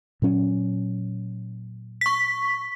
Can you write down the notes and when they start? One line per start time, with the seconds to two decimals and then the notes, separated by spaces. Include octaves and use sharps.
0.22 A#2 F#3 C#4
2.01 C#6 B6